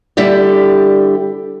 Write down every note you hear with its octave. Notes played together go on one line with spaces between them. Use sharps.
D3 G3 E4 G4 D5